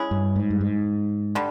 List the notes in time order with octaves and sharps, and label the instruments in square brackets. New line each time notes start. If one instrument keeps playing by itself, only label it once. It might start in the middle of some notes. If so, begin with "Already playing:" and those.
Already playing: [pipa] G#3 C#4 E4 G#4
[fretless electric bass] G2
G#2
G2
G#2
[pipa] D3 G3